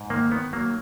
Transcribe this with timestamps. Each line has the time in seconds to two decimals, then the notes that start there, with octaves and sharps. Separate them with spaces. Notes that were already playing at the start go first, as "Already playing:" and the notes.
Already playing: G#2
0.10 D#3 A#3
0.31 D#3 B3
0.53 F#3 A#3